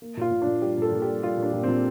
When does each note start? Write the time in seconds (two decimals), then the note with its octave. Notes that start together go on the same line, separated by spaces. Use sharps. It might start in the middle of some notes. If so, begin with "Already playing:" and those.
0.02 A#3
0.17 A#2 F4
0.31 A#2
0.42 D4
0.47 A#2
0.62 G3 G4
0.78 A#2 A4
0.92 A#2
1.02 G4
1.08 G3
1.23 G3 F4
1.38 A#2
1.43 D4
1.53 A#2
1.63 A#2 C4